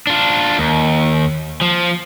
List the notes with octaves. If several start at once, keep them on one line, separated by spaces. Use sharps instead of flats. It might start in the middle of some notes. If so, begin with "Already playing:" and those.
D4 F4
D#2
F3